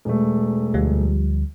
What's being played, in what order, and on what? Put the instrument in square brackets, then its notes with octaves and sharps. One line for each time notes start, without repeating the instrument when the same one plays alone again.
[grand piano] E1 A3
[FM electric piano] D2 F3 G3